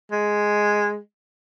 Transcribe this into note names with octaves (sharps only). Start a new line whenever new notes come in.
G#3